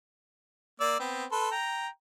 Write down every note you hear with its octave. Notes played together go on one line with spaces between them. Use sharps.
A#3 D5 E6
B3 C4
A4 B4 C6
G5 A#5